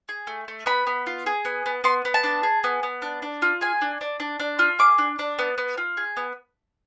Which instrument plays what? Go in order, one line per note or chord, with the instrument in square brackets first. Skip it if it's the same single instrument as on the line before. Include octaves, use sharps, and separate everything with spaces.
[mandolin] G#4
A3
A3
B3 B5
B3
F4
G#4
B3
B3
B3 C6
B3
A5
D4
G#4
B3
B3
D4
D4
F4
G#4 G#5
D4
D4
D4
D4
F4
G#4 D6
D4
D4
B3
B3
F4
G#4
B3